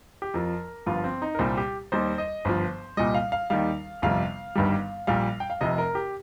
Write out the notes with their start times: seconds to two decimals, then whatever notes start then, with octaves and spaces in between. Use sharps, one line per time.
0.22 G4
0.34 F2 F3 A#4
0.86 G1 G2 F3 F4
1.04 C4
1.22 D#4
1.35 A#4
1.39 C2 A#2 G3 C5
1.57 G4
1.92 D#2 D#3 G3 C5
2.18 D#5
2.45 G1 G2 F3 C5
2.97 C2 A#2 G3 D#5
3.14 F5
3.32 F5
3.50 D#2 D#3 G3 F5
4.02 G1 F2 C3 G3 F5
4.55 G1 G2 D#3 G3
5.07 A#1 A#2 G3 F5
5.40 G5
5.50 F5
5.61 F1 F2 C3 D#5
5.78 A#4
5.95 G4